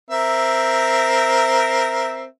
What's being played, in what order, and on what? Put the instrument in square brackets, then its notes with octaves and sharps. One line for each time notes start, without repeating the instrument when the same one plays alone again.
[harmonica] C4 A#4 E5